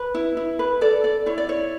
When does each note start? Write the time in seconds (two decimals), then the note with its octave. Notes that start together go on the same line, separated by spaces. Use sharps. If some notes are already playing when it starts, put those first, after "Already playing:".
Already playing: B4
0.15 E4
0.37 E4
0.59 B4
0.81 A4 D5
1.04 A4 D5
1.26 E4 C#5
1.38 D5
1.49 E4 C#5